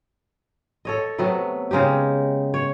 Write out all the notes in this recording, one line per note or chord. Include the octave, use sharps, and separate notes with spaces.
A4 C#5 D#5
C3 F#3 A3 B3
C#3 G#3 D#4 G4
C#5